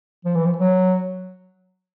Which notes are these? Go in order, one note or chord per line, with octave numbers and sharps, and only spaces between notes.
F3
E3
F3
F#3